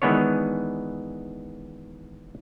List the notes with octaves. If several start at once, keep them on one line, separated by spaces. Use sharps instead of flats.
D#3 E3 G#3 B3 D4 C#5